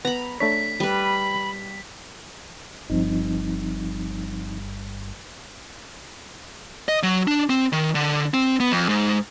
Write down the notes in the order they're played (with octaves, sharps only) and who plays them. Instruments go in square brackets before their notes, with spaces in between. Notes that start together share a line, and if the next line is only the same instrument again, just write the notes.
[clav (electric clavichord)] B3 [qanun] A#5 B5
[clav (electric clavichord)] A3 D4 C#5 [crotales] B6
[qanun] G3 B4 [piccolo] B5
[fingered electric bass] G1 G2 [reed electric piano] F3 C4 D#4
[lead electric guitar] D#5
F#3
D4
C4
D#3
D3
C4
B3
F2
G#2